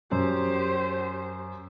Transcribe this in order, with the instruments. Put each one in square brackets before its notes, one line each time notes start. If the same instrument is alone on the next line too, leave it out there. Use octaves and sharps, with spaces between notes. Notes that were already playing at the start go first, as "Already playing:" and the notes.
[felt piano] F#2 [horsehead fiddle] G4 C5